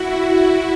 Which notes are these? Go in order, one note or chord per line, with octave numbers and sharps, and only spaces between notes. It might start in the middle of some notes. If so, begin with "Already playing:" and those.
Already playing: E4 F#4